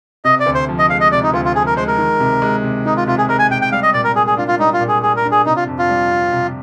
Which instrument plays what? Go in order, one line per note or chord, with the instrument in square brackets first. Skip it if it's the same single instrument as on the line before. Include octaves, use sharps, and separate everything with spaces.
[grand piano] C3 [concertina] D#5
[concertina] D5
[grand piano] D2
[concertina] C5
[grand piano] F3
[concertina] D#5
[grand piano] G#3 [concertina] F5
[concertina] D#5
[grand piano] C3 [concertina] D5
[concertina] D#4
[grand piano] D2 [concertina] F4
[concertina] F4
[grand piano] F3 [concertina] G#4
[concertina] A#4
[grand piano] G#3 [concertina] C5
[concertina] A#4
[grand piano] D#3
C3
G#3
C3
[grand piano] D#3 [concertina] D#4
[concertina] F4
[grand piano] C3 [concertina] F4
[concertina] G#4
[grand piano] G#3 [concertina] A#4
[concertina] G#5
[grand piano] C3 [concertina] G5
[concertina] G5
[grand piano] G3 [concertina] F5
[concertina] D#5
[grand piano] A#2 [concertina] D5
[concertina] A#4
[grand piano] A#3 [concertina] G#4
[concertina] G#4
[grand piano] D4 [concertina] F4
[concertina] F4
[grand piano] G3 [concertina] D#4
[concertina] F4
[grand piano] A#2
[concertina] G#4
[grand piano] A#3 [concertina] G#4
[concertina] A#4
[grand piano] D4
[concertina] G#4
[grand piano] C3 [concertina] D#4
[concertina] F4
[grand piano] F2
[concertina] F4
[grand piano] G3
C4
C3